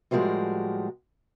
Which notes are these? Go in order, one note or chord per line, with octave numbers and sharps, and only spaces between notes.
A2 F3 G3 G#3 F#4 A#4